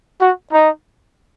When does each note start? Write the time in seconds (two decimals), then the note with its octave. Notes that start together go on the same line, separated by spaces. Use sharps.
0.21 F#4
0.52 D#4